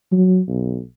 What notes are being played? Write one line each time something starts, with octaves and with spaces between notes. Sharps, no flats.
F#3
B1